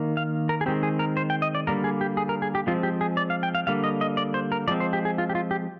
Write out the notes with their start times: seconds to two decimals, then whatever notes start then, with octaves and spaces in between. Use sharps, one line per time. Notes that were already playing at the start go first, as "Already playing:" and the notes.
Already playing: D#3 A#3
0.17 F5
0.49 A#4
0.61 G#4
0.66 D#3 G#3 C4 G4
0.83 G#4
0.99 A#4
1.17 C5
1.30 G5
1.42 D#5
1.55 D5
1.67 D3 G3 A#3 A#4
1.84 G#4
2.01 G4
2.17 G#4
2.29 A#4
2.42 G#4
2.55 G4
2.67 F3 G#3 C4 F4
2.83 G4
3.01 G#4
3.17 D5
3.30 F5
3.43 G5
3.55 F5
3.67 D3 G3 A#3 F5
3.84 D#5
4.01 D#5
4.17 D5
4.34 C5
4.52 A#4
4.68 F3 G#3 C4 D5
4.80 C5
4.93 G4
5.05 G#4
5.18 F4
5.29 G4
5.35 F4
5.51 G4